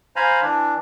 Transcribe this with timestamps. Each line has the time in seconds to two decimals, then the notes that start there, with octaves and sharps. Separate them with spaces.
0.16 C5 F5 G#5 A#5 B5
0.42 E3 D4